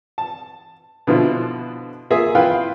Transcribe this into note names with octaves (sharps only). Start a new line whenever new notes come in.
A5
B2 D3 F3 E4 F4
A#3 F4 G#4 E5
E4 F4 B4 F5 G5